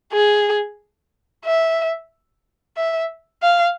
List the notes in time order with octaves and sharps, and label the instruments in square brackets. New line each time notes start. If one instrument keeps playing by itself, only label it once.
[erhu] G#4
E5
E5
F5